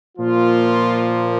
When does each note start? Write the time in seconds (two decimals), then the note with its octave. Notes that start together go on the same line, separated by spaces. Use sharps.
0.17 A#2 F3 A#3 F4